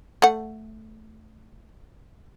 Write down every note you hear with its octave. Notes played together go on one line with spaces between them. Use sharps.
A3 F#5